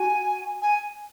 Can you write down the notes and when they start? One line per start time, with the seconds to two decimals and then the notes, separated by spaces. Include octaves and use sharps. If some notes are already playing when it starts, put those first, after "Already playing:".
Already playing: F#4 G#5
0.61 G#5